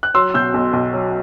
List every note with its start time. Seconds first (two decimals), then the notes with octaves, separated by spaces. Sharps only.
0.03 F#6
0.14 F#3 C6 E6
0.34 B2 E6 G6
0.54 B1
0.73 B1
0.93 F#3